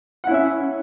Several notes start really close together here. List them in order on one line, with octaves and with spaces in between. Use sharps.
F#5 E4 C#4 E5